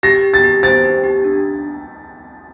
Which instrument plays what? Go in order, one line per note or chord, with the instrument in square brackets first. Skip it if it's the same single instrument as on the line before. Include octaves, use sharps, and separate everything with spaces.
[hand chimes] G4 [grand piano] A#6
[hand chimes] G4
[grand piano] A6
[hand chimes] G4
[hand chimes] C5 [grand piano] A6
[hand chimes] G4
G4
D4